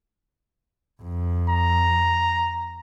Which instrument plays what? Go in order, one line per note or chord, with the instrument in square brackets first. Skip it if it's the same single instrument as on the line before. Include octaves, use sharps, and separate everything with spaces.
[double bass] F2
[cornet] A#5